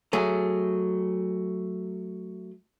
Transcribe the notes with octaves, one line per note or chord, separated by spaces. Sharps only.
F#3 A3 G#4